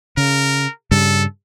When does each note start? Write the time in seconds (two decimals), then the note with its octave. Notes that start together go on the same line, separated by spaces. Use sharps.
0.17 C#3 A#4
0.91 G2 C#3 G3 A4